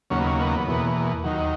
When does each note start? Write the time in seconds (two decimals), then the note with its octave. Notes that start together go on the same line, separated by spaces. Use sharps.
0.10 D#2 C#3 F#3 A#3 C#4
0.19 B3
0.27 C#4
0.40 B3
0.67 E2 B2 A#3
1.24 D#2 D#3 F#3